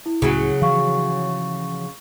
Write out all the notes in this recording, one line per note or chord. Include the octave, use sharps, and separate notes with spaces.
E4
C#2 A2 C#3 F#3 C#4
E3 F3 F5 C#6